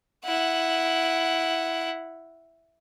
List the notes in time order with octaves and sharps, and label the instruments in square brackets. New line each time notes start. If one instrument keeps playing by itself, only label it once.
[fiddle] E4 F#5